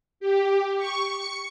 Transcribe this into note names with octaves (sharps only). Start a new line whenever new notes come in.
G4
C#6
C#7